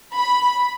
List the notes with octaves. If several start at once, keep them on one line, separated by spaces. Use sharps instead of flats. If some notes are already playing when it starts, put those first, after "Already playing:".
B5